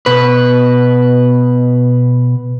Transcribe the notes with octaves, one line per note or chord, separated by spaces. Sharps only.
B2 B4